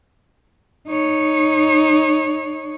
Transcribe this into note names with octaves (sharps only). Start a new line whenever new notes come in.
D#4 C#5